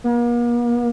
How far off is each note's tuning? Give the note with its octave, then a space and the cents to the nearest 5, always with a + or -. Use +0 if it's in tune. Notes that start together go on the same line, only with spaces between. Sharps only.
A#3 +45